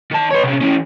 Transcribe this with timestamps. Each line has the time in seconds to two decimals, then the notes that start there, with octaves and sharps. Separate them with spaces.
0.11 D#3 A5
0.31 B4 C#5
0.44 C3 C#4
0.61 E3 C#4